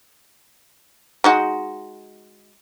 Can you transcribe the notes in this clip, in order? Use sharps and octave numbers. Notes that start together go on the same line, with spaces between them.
G#3 D#4 F#4